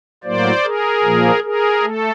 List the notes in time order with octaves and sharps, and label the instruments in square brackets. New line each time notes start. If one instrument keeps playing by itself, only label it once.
[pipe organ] A2 F#3 A#3 C5 D5
G#4 A#4
A#2 F3 A#3
G#4 A#4
A3 A4